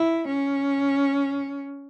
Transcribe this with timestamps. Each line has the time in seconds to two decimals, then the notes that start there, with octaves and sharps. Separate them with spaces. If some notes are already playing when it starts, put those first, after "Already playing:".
Already playing: E4
0.28 C#4